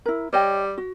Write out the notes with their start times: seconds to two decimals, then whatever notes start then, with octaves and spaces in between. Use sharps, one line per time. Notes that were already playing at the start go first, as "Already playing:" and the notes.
0.06 E4 A#4
0.33 G3 C#5 D#5 G5
0.78 F#4